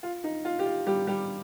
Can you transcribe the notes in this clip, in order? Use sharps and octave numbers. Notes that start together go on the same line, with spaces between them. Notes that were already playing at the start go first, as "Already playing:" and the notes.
F4
D#4
F4
G4
F4
G3 G4
G3 G4